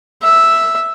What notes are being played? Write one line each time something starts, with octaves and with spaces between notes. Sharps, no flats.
E5